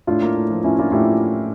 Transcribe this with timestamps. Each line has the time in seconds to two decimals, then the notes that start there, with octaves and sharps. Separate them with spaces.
0.07 A2 D4 F4
0.22 A#3
0.36 A2
0.50 F3
0.64 A2 C#4 E4
0.79 A#3 D4 F4
0.92 A2 E4 G4